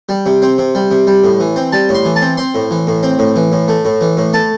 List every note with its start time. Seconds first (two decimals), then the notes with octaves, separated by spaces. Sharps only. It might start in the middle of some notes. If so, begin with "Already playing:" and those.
0.09 G3
0.26 C3
0.42 C4
0.58 C3
0.75 G3
0.91 C3
1.07 G3
1.24 A2
1.40 E3
1.56 C4
1.72 G3 A5
1.89 A2
1.94 C6
2.05 E3
2.16 A5
2.22 C4
2.37 C4 C6
2.55 A2
2.71 E3
2.87 A2
3.03 C4
3.19 A2
3.36 E3
3.52 A2
3.68 A3
3.85 A2
4.01 E3
4.17 A2
4.33 A3 A5